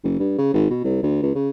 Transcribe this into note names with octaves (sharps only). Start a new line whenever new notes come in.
F#1
G2
C#3
G#1
B2
C2
D2
C#2
C#3